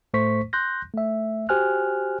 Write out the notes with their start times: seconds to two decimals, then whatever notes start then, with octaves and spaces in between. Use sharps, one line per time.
0.14 A2 A3 C5 C#6 B6
0.53 C6 F#6 G6 A#6
0.94 A3 E5
1.49 F#4 G4 C5 G#5 F6 F#6